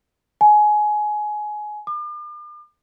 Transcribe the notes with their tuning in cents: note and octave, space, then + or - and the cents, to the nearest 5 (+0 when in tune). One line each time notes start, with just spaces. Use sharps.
G#5 +20
D6 +40